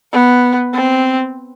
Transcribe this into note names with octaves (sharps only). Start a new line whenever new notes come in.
B3
C4